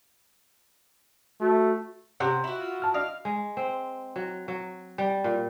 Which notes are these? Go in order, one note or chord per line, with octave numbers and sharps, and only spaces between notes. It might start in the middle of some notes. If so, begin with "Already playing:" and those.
A3 F#4
C3 C#4 G4 F#5 F#6
E4 F#4
F4
A5 F6
D4 D#5 F5
G#3
C4
F#3
F#3
G3
A#2